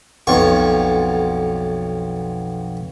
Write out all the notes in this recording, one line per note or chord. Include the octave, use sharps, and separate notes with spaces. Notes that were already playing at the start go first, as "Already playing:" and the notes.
B1 F2 C#6